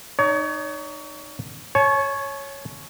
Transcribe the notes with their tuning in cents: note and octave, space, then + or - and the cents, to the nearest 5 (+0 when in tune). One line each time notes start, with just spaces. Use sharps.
D#4 -25 C#5 +30
C#5 -5 A5 -45